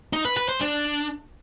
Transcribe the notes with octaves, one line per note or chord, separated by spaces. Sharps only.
D#4
B4
B4
C5
D4